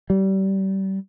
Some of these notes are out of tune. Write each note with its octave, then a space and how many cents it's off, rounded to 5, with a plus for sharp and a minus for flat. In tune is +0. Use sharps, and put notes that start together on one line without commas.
G3 -30